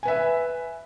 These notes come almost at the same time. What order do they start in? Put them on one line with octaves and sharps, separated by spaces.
G#5 B4 E5